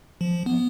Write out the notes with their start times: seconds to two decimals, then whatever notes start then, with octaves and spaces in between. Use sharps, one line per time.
0.21 F3
0.46 B3